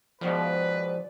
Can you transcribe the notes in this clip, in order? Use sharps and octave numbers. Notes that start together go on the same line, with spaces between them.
G#2 B2 D#3 F3 B4 D5